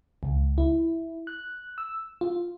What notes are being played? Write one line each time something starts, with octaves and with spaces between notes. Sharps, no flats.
C#2
E4
F#6
E6
F4